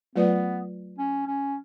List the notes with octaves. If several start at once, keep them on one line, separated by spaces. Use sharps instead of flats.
F#3 A3 B3 F4 B4 D5
C#4
C#4